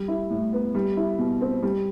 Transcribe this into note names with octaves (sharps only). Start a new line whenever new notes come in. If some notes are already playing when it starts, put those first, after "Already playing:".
Already playing: G3
E4
A2
B3
G3
E4
B2
C4
G3